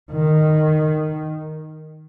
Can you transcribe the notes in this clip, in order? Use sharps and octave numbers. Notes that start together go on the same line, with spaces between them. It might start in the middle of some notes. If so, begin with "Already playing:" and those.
D#3